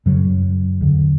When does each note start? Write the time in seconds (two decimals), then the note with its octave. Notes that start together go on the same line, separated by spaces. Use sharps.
0.06 F#2 C#3 F#3
0.81 E2 D3